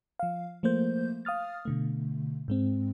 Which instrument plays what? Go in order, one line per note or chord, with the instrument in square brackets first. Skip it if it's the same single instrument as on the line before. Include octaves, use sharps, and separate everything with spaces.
[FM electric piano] F3 F5
F3 A3 A#3 C5 G6
F5 D#6 F6 A6
B2 D3 A3
G#2 G#3 C4